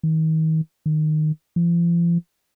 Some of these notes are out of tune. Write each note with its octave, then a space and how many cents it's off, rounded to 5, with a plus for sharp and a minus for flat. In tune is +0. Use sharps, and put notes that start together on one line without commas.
D#3 +35
D#3 -15
F3 -40